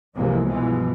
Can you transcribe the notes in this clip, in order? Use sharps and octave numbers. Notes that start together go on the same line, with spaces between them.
C2 F2 C3 E3 G#3 A#3
G2 B2 E3 F3 G#3